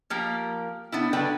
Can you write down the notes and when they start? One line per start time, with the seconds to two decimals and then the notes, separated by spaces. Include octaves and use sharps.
0.10 F3 A#3 G4 A#4
0.92 B3 D4 E4
1.13 D3 F#3 D4 B4 G5